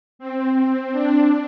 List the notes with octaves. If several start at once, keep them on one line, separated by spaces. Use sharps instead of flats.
C4
D4